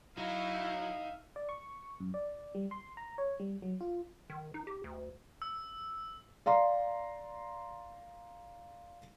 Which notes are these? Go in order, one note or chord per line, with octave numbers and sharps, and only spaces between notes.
F#3 D#4 E4 E5 F5
D5
C#6
F#2
D5
G3
C6
A#5
C#5
G3
F#3
F4
D#3
D#4
G4
D2
E6
D5 F5 A#5 C6